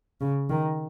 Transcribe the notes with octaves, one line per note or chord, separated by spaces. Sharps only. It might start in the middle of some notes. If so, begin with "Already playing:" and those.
C#3
D#3